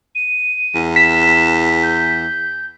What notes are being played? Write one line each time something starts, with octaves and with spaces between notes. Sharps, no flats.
D#7
E2
B6 E7
G6